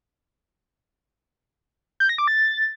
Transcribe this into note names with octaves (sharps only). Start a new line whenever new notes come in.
G6
A#6
D6
A6